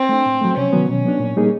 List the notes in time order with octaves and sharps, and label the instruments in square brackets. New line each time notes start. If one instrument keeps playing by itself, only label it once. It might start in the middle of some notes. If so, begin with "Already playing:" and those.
Already playing: [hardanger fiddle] C4
[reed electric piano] A3 D4
A2
F#3 A3
[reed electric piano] C3 [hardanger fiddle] C#4
[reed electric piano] D#3 F#3 B3
[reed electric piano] B2 [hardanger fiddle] C#4
[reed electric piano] F#3 B3 D4
A#2
G3 A#3 D#4 G#4